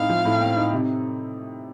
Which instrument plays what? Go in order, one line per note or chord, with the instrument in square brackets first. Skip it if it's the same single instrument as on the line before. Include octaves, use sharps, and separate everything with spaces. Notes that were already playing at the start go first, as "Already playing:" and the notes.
Already playing: [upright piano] A2 C4 D#4 [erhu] F5
[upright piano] F3
A2
C4
D#4
C3